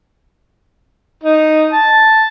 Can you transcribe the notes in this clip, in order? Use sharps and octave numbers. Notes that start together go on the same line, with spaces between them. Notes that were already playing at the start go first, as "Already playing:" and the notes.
D#4
A5